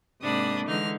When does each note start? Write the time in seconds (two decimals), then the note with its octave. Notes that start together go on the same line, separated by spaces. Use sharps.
0.22 G#2 C3 A#3 D4 B5 D#6
0.67 D3 E3 G#3 D#4 F6 A#6